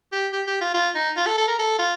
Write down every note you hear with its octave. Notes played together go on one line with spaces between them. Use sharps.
G4
G4
G4
F4
F4
D#4
F4
A4
A4
A#4
A4
F4